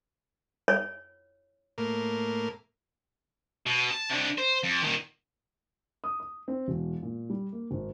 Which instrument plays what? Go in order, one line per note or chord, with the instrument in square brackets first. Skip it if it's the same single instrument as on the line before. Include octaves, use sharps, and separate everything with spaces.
[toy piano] C#5
[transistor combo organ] A2 A#3
[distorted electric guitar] B2
A5
C3 D4
C5
F2
A#2 D#3
[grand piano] D#6
D#6
C4
E1
A#2
G3
A#3
G#1